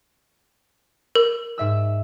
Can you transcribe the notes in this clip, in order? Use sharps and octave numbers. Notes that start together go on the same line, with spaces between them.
A#4
G#2 E5 E6